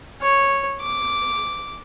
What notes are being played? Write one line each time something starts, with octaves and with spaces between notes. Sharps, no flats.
C#5
D6